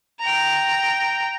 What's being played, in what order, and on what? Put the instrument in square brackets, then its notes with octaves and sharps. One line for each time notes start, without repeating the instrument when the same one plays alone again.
[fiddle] G5 A#5